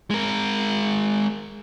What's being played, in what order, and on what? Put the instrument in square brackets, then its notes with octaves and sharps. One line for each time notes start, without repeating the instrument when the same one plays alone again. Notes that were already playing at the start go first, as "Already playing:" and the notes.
[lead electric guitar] G#3 A#4